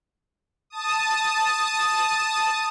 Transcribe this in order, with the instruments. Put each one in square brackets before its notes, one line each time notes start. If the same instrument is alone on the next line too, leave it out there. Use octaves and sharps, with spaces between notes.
[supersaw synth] A5 D#6